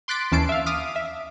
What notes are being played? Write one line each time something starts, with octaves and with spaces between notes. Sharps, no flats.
C6 D6 F#6 A6 B6 D7
D#2 E3 C#4 A5 C7 D7
E5 F5
D6 D#6 F6 B6
E5